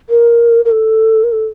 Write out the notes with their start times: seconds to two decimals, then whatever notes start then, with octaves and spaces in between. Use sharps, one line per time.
0.10 A#4
0.65 A#4
0.71 A4
1.24 A#4
1.32 A4